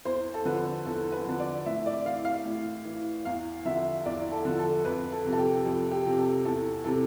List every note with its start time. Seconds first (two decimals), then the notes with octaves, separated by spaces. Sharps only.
0.05 E2 C5
0.34 A4
0.45 D3 F3 B4
0.85 E2 A4
1.12 B4
1.25 D3 F3
1.39 D5
1.66 A2 E5
1.86 D5
2.05 E3 F5
2.25 F5
2.45 A2
2.85 E3
3.25 E2 F5
3.65 D3 F3 E5
4.05 E2 D5
4.31 A4
4.45 D3 F3
4.59 A4
4.84 F2 B4
5.12 A4
5.25 C3 F3
5.33 A4
5.38 G4
5.65 F2 A4
5.91 G4
6.05 C3 F3
6.19 A4
6.45 E2 A4
6.84 C3 E3 A4